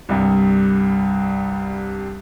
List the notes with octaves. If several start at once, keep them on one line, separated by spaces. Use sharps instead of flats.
C2 G2